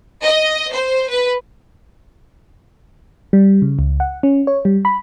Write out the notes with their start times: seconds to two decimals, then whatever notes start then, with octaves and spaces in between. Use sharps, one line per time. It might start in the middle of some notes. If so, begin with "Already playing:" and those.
0.24 D#5
0.72 C5
1.09 B4
3.33 G3
3.62 C#3
3.79 C#2
4.00 F#5
4.23 C#4
4.47 C#5
4.65 G3
4.85 B5